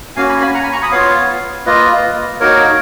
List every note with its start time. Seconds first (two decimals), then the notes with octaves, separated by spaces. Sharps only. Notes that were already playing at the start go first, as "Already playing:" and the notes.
0.16 A#3 C#4 F#4 F5 G#5
0.29 G#5 B5
0.41 G#5 B5
0.54 F#5 A#5
0.63 G#5 B5
0.72 A#5 C#6
0.82 B5 D#6
0.91 B3 F4 C#5 F5
1.66 A#3 F4 B4 D#5
2.41 A#3 D#4 F#4 A#4 C#5